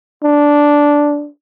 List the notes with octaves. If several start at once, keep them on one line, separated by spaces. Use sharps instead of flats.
D4